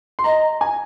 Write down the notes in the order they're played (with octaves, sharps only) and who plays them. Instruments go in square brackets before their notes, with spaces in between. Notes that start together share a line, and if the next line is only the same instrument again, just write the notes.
[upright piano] C6
[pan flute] D#5 [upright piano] A#5
[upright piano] G#5